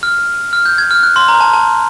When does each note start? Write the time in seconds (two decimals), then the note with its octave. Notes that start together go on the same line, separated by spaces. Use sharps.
0.03 F6
0.53 F6
0.66 G6
0.78 G#6
0.91 F6
1.03 F#6
1.16 C6
1.28 A#5
1.41 A5
1.53 A5